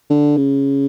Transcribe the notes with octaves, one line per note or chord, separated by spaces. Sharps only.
D3
C#3